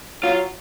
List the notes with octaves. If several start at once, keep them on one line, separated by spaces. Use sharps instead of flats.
F#3 F4